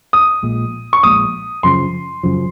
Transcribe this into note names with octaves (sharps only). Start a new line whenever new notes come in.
D#6
A#1 A#2 G#3
C#6
A#1 A#2 G#3 D#6
F#2 C#3 F3 C6
F#2 C#3 F3